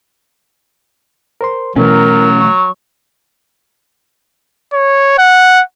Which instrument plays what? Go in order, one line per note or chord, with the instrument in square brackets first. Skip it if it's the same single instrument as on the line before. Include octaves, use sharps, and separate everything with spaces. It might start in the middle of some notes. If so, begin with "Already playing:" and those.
[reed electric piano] A#4 C5 C6
[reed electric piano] B2 E3 [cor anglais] F#3 [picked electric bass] A3 A#3 C#4 [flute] A#4
[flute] C#6
[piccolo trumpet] C#5
F#5